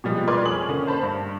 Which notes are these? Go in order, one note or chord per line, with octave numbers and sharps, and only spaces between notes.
B2 F3 G3 G#3
B4 D5 C6 D6 F6 G#6
F2 G#4 C#5 D6 D#6 F#7
D3 A#3 C#4
C5 A5 B5
G2